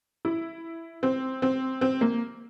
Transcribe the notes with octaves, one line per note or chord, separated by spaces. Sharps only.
E4
C4
C4
C4
A#3